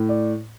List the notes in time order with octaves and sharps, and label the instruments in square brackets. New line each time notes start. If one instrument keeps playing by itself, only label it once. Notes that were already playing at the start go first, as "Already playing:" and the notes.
Already playing: [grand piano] A2
D5